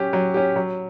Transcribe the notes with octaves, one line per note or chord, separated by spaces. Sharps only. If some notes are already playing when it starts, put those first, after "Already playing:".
Already playing: F#3 C#4 G4
F#3
C#4 G4
F#3